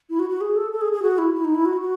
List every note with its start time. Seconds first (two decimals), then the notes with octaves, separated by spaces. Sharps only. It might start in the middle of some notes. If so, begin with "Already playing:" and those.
0.10 E4
0.19 F#4
0.29 F#4
0.41 G#4
0.56 A4
0.72 A4
0.81 G#4
0.92 G#4
1.02 F#4
1.18 E4
1.34 E4
1.45 D#4
1.55 E4
1.65 F#4
1.81 F#4